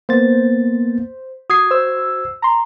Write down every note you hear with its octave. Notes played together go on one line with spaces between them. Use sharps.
A#3 B3 C5 A6
F#4 D#6 G#6 C7
C5 E6
A#5 C6